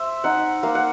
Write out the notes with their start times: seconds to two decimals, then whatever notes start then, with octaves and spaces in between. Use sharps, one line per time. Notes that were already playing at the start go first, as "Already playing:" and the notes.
Already playing: C5 E5
0.24 D#4 F#5
0.63 A#3 F5
0.75 F#5